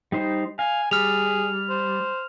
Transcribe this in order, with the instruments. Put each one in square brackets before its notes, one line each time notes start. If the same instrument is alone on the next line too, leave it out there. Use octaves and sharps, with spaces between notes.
[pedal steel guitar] G3 D#4 C5
[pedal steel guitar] F5 [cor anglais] G#5
[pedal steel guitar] G3 [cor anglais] G#4 [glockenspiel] F6 F7
[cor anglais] C5